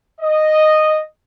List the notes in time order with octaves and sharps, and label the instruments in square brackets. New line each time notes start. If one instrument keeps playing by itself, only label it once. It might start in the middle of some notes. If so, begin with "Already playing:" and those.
[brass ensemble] D#5